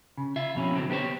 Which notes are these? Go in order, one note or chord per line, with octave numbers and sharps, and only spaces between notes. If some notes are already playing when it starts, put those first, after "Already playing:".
C#3
F4 E5
F2 B2 C#4 E4
D3 F#3 C4
B3 G4 A#4 C5 C#5